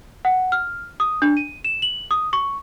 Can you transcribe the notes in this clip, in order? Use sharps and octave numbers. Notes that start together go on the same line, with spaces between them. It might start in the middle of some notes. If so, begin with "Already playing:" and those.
F#5
F6
D#6
D4
D#7
E7
F#7
D#6
C#6